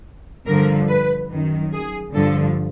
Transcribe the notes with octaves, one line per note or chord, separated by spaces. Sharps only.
G2 D3 F3 A#4
B4
F#2 D#3
G#4
G2 D3 F3 A4